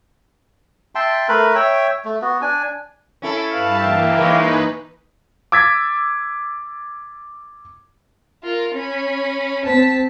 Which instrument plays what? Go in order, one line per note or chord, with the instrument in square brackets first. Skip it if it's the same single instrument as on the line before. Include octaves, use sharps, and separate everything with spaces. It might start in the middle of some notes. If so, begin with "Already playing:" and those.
[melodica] E5 G5 A5 C6
A3 A#4 B4 B5
C#5 E5 G5
A3
B3 F#4
D4 G#5
[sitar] C#4 E4 A4
[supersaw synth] G2 A5 [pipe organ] B4 F5 B5
[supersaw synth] E3 A#3 [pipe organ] E5 F5 G5
[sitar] E3 G#3 C#5 [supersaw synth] D#4 B4
[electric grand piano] D6 E6 G#6 A6 B6
[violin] F4 A#4
C#4 B5
[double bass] C4 [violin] A5 B6